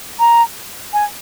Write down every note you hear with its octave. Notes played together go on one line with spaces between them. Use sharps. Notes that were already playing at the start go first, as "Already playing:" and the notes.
A#5
G#5